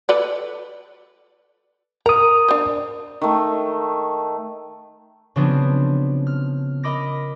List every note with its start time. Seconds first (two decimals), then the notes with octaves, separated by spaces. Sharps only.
0.09 A4 B4 D5
2.06 A#4 A#5 D#6
2.48 D4 C5
3.21 D#3 A3
5.36 C#3 F3 F#3 B3 C4 D4
6.27 F6
6.84 A#4 D#5 B5 D6 A#6